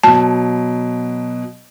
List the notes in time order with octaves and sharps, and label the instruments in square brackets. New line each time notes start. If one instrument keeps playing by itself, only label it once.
[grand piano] B2 F#3 [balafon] A5